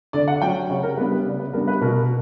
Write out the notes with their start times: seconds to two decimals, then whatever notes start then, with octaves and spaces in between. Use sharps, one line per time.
0.13 D3 D5
0.28 F#5
0.41 F#3 G5
0.45 C#4
0.69 C#3 C#5
0.83 A#4
0.97 G3 B3 D4 B4
1.12 B4
1.25 C#3 D5
1.39 B4
1.53 G3 B3 D4 A#4
1.67 B4
1.81 B2 A#4